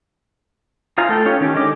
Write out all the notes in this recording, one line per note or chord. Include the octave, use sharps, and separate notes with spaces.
D#4 F4 C5 G#5 A#5
A3 A4 G5
C#4 D#4 F4 G4 C#5
D#3 C#4 G4
D3 G#3 C#5 D#5 D6